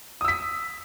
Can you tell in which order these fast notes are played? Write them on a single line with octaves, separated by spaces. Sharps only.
D#6 E6 B6